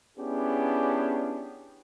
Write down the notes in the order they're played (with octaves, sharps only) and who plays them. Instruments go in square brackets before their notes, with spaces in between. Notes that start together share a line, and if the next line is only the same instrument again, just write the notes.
[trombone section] B3 C#4 D4 E4 G4 G#4